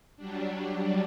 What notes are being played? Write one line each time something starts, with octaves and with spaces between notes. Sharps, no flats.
F#3 G3 D4